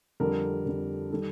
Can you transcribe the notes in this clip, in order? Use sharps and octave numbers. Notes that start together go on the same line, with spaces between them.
F2 D3 G3 A#4
F2 D3 G3
D#3 G3 A4